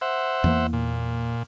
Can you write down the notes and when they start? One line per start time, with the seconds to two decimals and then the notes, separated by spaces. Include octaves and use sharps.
0.01 C5 E5 F#5
0.44 E2 E3 A#3
0.73 A#2